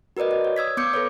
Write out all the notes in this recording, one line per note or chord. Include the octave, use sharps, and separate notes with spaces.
F#4 A#4 B4 D5 D#5
D5
C#5
D#6 E6 G#6 B6
B3 D6 G6 C#7
A4 B4 C#5